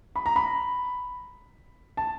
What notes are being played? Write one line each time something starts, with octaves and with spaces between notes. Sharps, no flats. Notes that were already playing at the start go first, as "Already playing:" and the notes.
B5
A#5
B5
A5